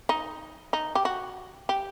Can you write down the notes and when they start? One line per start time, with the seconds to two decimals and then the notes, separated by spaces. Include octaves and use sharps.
0.09 D#4
0.73 D#4
0.95 G4
1.05 F#4
1.69 G4